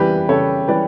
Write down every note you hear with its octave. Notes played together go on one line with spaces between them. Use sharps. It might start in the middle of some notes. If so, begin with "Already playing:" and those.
Already playing: C#3 E3 G3 G4 B4
C#3 A4 C#5
E3 G3 B4 D5